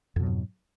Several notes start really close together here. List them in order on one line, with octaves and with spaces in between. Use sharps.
F2 B2 F#3 G#2